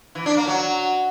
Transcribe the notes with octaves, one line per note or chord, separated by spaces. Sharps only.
E3
D4
A#3
F#3